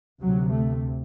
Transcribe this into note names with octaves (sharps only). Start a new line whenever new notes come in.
D2 C3 F#3
A3